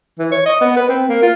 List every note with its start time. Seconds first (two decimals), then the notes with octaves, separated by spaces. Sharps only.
0.19 E3
0.32 C#5
0.45 D#5
0.61 B3
0.77 B4
0.89 C4
1.09 A#3
1.22 F4